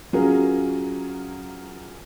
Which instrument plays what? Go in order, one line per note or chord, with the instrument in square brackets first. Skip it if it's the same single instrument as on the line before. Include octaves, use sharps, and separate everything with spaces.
[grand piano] F#3 C#4 F4 G#4 A#4